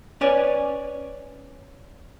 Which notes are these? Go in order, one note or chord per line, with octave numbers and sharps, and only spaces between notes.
C#4 B4 C#5 D5 G#5